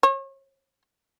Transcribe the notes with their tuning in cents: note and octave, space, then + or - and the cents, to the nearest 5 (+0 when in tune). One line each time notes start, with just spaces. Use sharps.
C#5 -35